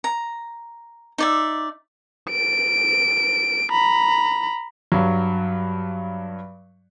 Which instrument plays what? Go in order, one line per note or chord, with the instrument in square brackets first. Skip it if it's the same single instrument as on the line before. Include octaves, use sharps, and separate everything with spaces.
[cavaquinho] A#5
D#4 D5 E5
[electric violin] D7
A#5 B5
[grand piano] G2 F#3